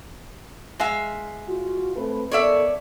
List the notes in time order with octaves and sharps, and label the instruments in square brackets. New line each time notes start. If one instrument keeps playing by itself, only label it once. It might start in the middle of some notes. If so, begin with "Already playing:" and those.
[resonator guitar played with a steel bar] G#3 E5 F5
[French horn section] F4 F#4
A3 C4 B4
[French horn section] D#3 B3 A4 [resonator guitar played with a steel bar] C#5 D5 E5